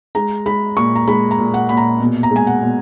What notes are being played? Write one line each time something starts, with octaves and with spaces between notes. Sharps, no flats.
G#3 A#5
G#3 B5
A#2 C#6
A#5
G#3 B5
A#5
A#2
F#5
A#2 B5
A#5
B2
A#5
G#3 G#5
F#5
B2